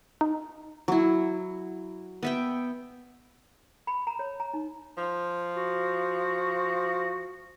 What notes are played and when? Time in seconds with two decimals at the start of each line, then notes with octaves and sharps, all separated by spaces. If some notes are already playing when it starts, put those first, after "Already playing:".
0.21 D#4
0.88 F#3 E4
2.23 B3 E5 G5
3.87 B5
4.07 A#5
4.19 C#5
4.40 A#5
4.54 D#4
4.98 F3
5.57 F#4